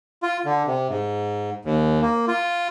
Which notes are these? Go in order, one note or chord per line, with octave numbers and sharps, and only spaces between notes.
F4
D3
C3
G#2
D#2
A#3
F4